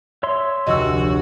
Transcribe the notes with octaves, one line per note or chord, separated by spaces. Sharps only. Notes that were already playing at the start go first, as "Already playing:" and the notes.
C#5 E5 C6
F1 D2 F#4 D#5 E6